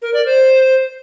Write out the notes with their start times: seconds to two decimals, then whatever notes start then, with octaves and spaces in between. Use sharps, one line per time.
0.02 A#4
0.14 D5
0.26 C5